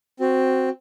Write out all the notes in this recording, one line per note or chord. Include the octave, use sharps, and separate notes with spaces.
C4 F#4